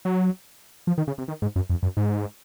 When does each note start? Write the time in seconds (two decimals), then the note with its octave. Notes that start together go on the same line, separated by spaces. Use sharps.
0.05 F#3
0.87 F3
0.98 D#3
1.07 C#3
1.18 C3
1.28 D#3
1.42 G#2
1.56 F#2
1.70 F2
1.83 F#2
1.97 G#2